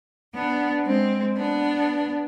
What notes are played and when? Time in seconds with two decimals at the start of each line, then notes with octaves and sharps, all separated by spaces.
0.34 B3 D4
0.85 G#3 C4
1.36 B3 D4